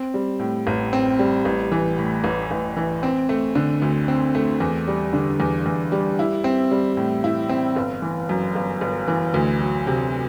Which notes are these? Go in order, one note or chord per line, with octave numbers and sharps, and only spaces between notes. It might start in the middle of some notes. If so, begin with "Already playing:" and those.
Already playing: C4
G3
A2
A1
C4
G3
A1
E3
A2
A1
A1
E3
C4
A3
D3
D2
C4
A3
E2
G3
D3
E2
E2
G3
E4
C4
G3
A2
E4
C4
G1
E3
F#2
G1
G1
E3
D2
F#3
C3